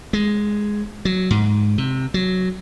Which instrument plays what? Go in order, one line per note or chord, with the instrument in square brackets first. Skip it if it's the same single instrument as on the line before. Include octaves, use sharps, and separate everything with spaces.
[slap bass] G#3
F#3
G#2
C3
F#3